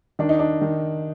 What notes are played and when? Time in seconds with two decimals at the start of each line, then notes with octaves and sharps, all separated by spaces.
0.19 D#3 D4
0.29 D#4
0.39 D4
0.62 D#3